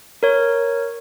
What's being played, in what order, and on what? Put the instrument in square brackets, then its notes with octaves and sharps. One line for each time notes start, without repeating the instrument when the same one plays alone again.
[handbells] A#4 C#5